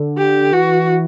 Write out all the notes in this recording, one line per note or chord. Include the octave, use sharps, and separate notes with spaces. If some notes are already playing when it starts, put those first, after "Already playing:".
Already playing: D3
G4
E3 F#4